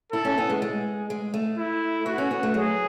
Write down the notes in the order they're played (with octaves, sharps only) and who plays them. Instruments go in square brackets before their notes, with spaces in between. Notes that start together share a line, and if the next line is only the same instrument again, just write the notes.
[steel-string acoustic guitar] E4 [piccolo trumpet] A4
[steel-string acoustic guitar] C#4
B3
G#3
G#3
G#3
A3
[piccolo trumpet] E4
[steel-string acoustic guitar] B3 [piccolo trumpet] F#4
[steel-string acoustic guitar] C#4
B3
A3
[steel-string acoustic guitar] F#3 [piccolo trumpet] G#4